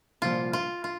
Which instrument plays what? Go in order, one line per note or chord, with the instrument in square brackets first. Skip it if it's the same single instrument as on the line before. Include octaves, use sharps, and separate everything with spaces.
[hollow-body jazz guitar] C2 A#2 F3 [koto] F4
[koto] F4
F4